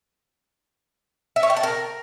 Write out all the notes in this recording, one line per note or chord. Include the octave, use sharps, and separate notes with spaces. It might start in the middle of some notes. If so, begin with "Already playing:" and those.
E5
C#5
G5
A5
A#4